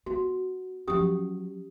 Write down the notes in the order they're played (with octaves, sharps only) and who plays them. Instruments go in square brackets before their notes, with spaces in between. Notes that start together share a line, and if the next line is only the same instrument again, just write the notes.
[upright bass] B3 [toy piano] F#4
[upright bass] F3 F#3 [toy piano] C#4 G4 D#6